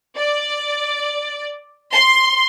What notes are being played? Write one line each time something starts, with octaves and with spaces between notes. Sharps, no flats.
D5
C6